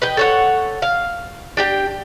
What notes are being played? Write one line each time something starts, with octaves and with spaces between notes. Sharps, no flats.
B4 D#5 G5
A4 C#5 F#5
F5
D4 G4 G5